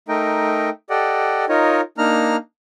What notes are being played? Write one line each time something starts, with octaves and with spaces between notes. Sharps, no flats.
A3 D#4 A#4 D#5 G5
G4 A4 D5 D#5 F#5 G5
D#4 F4 A#4 C#5 D#5
A#3 D4 D#4 A#5 F6